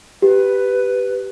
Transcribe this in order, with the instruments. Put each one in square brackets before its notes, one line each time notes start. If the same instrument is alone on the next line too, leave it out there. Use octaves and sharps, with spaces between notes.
[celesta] G4 [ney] B4